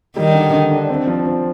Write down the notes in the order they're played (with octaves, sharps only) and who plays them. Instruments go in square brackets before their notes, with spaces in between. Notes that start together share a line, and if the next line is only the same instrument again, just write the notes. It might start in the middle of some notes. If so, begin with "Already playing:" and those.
[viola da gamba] D#3 [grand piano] G3
[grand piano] D3
D3
D4
C4
F3
F3